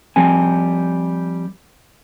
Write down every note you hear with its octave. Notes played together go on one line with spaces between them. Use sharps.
F3 G3 C4 G#5